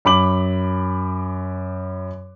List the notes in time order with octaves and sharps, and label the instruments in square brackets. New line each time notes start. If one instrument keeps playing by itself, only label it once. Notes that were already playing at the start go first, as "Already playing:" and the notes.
[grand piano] F#2 B5 D6 F#7